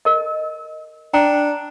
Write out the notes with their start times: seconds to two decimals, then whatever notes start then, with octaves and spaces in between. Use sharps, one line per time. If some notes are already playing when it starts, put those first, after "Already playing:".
0.05 A#4 D#5
1.14 D4 G5 A#5